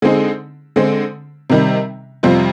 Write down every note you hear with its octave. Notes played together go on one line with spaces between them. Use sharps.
D3 G#3 C4 D#4 G#4
D3 G#3 C4
C3 D#3 G3
F2 C3 G3 C4 F4